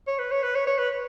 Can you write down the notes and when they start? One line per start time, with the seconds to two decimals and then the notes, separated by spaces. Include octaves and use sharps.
0.07 C#5
0.19 B4
0.32 C#5
0.43 B4
0.55 C#5
0.67 C#5
0.79 B4